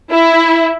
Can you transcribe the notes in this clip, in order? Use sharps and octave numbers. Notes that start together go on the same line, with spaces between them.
E4